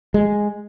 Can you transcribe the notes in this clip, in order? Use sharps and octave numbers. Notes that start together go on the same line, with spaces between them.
G#3